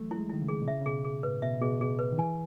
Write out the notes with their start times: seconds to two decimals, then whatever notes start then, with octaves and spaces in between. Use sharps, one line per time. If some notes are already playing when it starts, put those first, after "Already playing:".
Already playing: E3 F#3 A3
0.11 E4
0.17 G#3
0.29 D#3 E4
0.42 C#3
0.48 G#4
0.62 B2
0.67 C#3 E5
0.81 C#3
0.86 B2 G#4
1.04 G#4
1.23 A2 B4
1.42 B2 E5
1.61 B2 G#4
1.81 B2 G#4
1.99 B4
2.12 D#3
2.18 E3 G#5